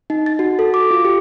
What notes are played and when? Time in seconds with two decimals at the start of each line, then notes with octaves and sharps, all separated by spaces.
0.10 D#4
0.26 A6
0.39 F#4
0.59 A4
0.74 D6
0.91 F4
1.05 G4